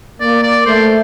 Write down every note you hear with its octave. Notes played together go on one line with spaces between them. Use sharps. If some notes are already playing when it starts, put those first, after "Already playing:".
A#3 D5
D5
A3 C5